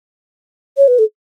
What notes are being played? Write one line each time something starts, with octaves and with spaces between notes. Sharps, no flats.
C#5
B4
A4